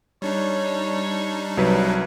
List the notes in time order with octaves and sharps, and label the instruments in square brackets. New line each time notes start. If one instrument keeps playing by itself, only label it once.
[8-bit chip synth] G3 D4 D#4 [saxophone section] C#5
[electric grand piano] C2 F#3 B4